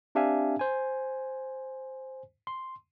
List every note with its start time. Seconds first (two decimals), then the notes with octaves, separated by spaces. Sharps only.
0.15 C4 D4 G4 E5 F5 G#5
0.59 C5 G#5
2.47 C6